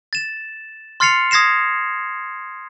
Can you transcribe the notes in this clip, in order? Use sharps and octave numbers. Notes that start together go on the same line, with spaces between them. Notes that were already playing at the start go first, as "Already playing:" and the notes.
A6 E7
C6 F6 A6 C7 C#7 F7
D#6 G#6 A#6 C7 E7